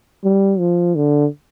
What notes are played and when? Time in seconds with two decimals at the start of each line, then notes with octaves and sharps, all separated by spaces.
0.24 G3
0.59 F3
0.95 D3